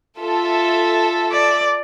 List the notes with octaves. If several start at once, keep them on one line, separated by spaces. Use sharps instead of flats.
F4 A4 E5
D5